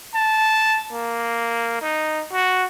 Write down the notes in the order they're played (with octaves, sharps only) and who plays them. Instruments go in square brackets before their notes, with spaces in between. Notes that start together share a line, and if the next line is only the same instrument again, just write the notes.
[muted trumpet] A5
A#3
D#4
F#4